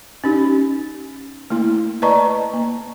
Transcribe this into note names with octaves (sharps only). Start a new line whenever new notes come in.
C#4 D#4 G4
A3 A#3 E4
B4 D5 D#5 A5 A#5 C#6
A#3